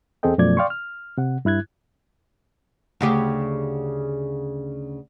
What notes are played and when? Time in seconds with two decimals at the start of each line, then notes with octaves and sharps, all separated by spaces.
0.23 E2 C4 G#4 A4 D#5 G5
0.38 F#2 B2 F3 A3 D5 G#6
0.57 D5 F5 G5 C6 C#6
0.70 F6
1.18 C3 F#5
1.45 G2 E4 F#6 G#6
3.01 D2 C#3 G4